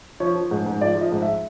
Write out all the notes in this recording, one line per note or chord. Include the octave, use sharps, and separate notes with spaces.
F3 C#5
F3
G#2
G#2
F3 D5
F3
D#5
G#2
E5